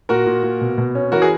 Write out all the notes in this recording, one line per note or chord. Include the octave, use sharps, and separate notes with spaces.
A#2 F#4 A#4
A#2
A#2
B2
B2
C#4
E3 F#4 A#4
G#4